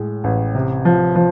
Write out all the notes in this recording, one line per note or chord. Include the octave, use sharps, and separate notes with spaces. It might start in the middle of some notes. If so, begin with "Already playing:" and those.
Already playing: A2 G#3
A1
C3
F3
F3